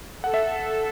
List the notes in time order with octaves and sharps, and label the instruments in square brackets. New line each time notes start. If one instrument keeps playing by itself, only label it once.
[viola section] A4 [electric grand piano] F#5
[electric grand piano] E5